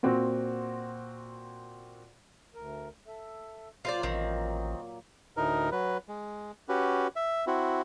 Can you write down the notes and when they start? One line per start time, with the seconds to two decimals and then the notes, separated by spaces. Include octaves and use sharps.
0.03 A#2 C4 F#4
2.55 D2 A#4
3.07 A4 E5
3.85 A#2 F#3 A#3 F4 C5 D5
4.03 A1 D#3 C4
5.37 D2 A2 D#4 A#4
5.72 F#3 B4
6.08 G#3
6.69 C#4 F#4 G4 B4
7.16 E5
7.47 C4 E4 F#4